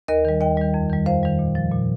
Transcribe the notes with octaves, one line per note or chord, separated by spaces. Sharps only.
D#2 A#4 D#5
D#3 G3
D#2 D#5 G5
D#3 G3
F2
D#3 G3
F2 C5 F5
D#3 G3
A#2
F3
A#2